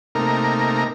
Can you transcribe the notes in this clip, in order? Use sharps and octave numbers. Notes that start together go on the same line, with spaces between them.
C3 A3 A#3 D#4 A#4 A#5